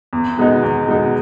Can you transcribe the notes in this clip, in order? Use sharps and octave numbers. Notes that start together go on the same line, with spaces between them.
E2
B2 G#3 B3 D#4
E2
B2 G#3 B3 D#4